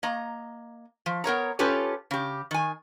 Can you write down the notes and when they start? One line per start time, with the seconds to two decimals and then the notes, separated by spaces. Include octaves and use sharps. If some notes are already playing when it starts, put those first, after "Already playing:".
0.03 A#3 D#5 A#5
1.06 F3
1.24 B3 A#4 C#5 A#5
1.59 C#4 F4 G4 A4 B4 C#5
2.11 C#3 G4
2.51 D#3 G#5